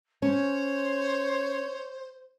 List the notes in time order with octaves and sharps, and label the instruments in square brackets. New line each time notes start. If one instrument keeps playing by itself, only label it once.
[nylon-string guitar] C#4 [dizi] C5 [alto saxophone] C#5